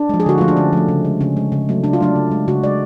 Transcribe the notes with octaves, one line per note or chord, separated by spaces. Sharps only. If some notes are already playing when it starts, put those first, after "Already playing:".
Already playing: D4
F3 G#3
G#4
D3 F#4
F3 A3 F4
D4
D3 C#4
F3 A3
C#3
G#3
C#3 C#4
G#3
C#3
F#3 A3
C#3 D4
F4
F#3 A3 D4
C#3
G#3
C#3 F#4
G#3 D5